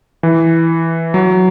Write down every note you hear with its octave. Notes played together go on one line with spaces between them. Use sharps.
E3
F#3